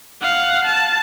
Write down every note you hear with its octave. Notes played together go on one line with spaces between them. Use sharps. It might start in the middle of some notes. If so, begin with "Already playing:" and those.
F5 F#5
A5